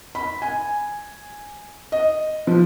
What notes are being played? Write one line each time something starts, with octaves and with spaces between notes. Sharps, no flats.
B5
G#5
D#5
F3